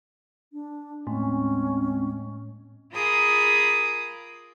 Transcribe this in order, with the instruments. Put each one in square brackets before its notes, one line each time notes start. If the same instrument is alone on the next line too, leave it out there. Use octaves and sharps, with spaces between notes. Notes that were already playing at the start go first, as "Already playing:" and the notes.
[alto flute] D4
[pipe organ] D#2 G#3 C4 [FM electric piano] A2 [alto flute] C#4
[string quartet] F4 G#4 A#4 B5 D6 D#6